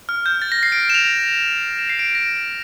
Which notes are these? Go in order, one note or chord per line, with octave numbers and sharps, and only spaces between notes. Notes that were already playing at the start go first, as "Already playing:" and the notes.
F6
G6
A6
A#6
C7
D7
E7
F7
E7
C7
D7
A#6